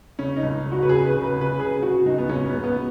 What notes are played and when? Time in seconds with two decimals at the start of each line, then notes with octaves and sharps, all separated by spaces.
0.19 C#3 C#4
0.36 D#4
0.43 C#2
0.66 C#3
0.72 F#4
0.82 B4
0.89 C#3 G#4
1.06 B4
1.12 C#3
1.23 B4
1.36 C#3
1.41 B4
1.59 C#3 G#4
1.82 C#3 F#4
2.05 C#2 D#4
2.18 B3
2.29 C#2 C#4
2.46 B3
2.52 C#2
2.64 B3